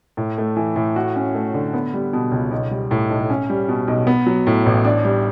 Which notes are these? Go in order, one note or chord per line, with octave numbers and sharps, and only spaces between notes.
A2
A3
E3
A2
F#4
C#4
A3
D3
B3
G3
B2
C#2
B1
G3
A2
B1
C#4
G3
B2
B1
B3
F#3
A2
A1
D4
G3